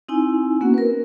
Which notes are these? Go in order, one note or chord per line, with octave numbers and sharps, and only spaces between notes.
C4 D#4 E4 G#5 E6
A#3 B3 C#4 F#4 F#5
A#4 B4